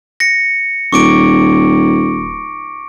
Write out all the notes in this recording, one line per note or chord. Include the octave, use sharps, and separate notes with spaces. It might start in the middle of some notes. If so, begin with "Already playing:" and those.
A#6 C#7
D#1 C#6 D6 D7